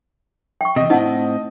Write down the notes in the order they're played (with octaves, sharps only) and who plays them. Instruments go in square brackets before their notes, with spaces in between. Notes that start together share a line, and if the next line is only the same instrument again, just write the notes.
[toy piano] G5 C#6
[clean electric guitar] E2 C3 [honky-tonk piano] D#5
[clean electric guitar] A2 C4 [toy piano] D#4 F#5 A5